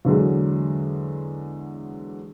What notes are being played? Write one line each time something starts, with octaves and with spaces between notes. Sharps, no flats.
E2 D3 F#3 G#3